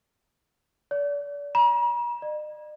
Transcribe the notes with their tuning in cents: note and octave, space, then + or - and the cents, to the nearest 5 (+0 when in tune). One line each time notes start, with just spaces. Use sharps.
D5 -35
A#5 +45
D#5 -45